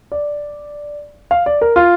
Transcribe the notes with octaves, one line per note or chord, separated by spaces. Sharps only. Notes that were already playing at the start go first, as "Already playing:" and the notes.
D5
F5
D5
A#4
F4